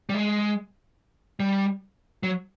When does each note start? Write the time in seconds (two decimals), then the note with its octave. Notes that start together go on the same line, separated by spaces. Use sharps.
0.09 G3
0.14 G#3
1.40 G3
2.23 F#3